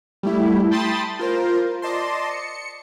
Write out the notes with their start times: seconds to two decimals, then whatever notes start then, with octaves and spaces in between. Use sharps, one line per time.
0.23 G3 A3 E4
0.71 G5 A5 B5 C6 D#6 A6
1.19 F4 A#4 C5
1.82 D5 D#5 A5 C6
2.31 C#7